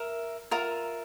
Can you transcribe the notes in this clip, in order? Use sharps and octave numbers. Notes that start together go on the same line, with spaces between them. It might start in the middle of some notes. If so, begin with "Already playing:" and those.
Already playing: A#4 E5 A#5
F4 A#4 E5